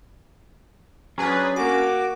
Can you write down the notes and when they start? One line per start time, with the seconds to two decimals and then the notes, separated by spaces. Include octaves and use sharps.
1.18 F#3 C#4 D4 G#4 B4
1.56 A#3 F#4 D6